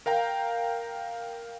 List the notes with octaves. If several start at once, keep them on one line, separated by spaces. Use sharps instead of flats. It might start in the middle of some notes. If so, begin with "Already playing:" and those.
A#4 F5 G5 A#5